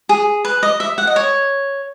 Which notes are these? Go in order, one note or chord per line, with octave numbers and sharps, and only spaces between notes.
G#4
B4
D#5
E5
F#5
D#5
C#5